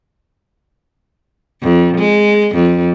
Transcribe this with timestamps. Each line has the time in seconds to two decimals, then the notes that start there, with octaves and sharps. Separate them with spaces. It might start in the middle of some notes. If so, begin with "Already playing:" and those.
1.62 F2
1.98 G#3
2.55 F2